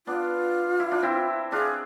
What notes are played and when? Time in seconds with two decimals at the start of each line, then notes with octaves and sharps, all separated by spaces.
0.07 B3 D4 F4
0.80 E4
0.92 D4
1.02 C4 E4
1.52 D4 F4 G#4